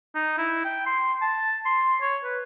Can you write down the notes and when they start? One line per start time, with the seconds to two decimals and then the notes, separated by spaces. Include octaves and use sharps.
0.15 D#4
0.38 E4
0.65 G5
0.86 C6
1.22 A5
1.65 C6
2.02 C#5
2.24 B4